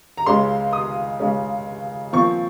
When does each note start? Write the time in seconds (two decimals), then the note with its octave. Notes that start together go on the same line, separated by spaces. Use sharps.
0.17 A#5
0.26 C#2 C#3 G#3 C#4 C6
0.73 D#6
1.20 C#2 C#3 G#3 C#4
2.13 A#2 F3 C4 C#6